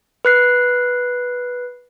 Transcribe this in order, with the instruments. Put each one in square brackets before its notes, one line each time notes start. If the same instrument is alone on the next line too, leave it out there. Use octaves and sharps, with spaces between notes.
[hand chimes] B4 F#6 C7